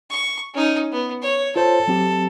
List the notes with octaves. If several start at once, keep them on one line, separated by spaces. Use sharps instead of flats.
C#6
C#4 D#4
B3
C#5
F4 A4 C5 C#5
F#3 C4 G4